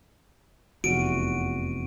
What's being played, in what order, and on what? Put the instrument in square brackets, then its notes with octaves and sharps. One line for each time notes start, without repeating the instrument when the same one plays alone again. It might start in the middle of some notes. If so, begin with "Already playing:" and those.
[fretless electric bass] F1 E2 [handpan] F#4 [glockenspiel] D7 D#7